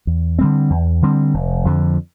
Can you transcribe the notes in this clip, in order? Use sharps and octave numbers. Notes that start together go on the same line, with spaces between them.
E2
D3 G3 C4
E2
D3 G3 C4
F1
F2 D3 F3